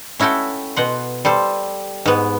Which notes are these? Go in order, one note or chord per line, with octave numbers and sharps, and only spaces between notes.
C#4 E4 F#4 A4 G5
B2 F#5 C6
G3 A4 C5
G#2 B3